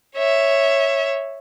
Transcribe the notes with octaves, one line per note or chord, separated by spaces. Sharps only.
C#5 E5